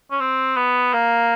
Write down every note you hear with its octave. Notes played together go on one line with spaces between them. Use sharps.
C#4
C4
B3
A#3